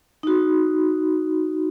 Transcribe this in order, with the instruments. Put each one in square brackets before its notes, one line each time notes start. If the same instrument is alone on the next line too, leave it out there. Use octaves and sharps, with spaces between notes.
[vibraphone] D#4 F#4